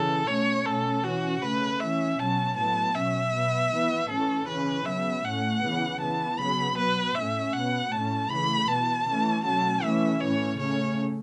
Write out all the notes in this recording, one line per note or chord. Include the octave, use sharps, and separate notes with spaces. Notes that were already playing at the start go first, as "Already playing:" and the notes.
Already playing: C#3 E3 A4
B2 A3 C#4 C#5
B2 A3 C#4 A4
E3 C#4 F#4
C#3 A3 C#4 B4
E3 C#4 E5
B2 F#3 C#4 A5
A2 F#3 B3 A5
B2 F#3 C#4 E5
B2 B3
E3 B3
A2 E3 C#4 A4
C#3 E3 C#4 B4
C#3 F#3 B3 E5
A2 A3 C#4 F#5
C#3 E3 B3
E3 B3 A5
C#3 F#3 B3 B5
B2 F#3 B3 B4
A2 A3 C#4 E5
B2 B3 F#5
A2 A3 C#4 A5
C#3 E3 A3 B5
B2 B3 A5
E3 A3 C#4
B2 F#3 A3 C#4 A5
E3 A3 C#4 E5
A2 E3 A3 C#4 C#5
C#3 A3 C#4 C#5